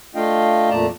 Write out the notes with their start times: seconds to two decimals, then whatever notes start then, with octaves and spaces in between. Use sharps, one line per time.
0.15 A3 D4 F4 D#5 F5 G5
0.70 F2 A#2 A3 D5 A5 A#5